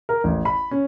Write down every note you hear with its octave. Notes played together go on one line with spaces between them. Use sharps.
A#4
A1
B5
C#4